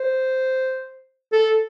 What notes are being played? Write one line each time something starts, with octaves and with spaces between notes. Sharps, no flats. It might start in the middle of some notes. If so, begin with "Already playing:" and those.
Already playing: C5
A4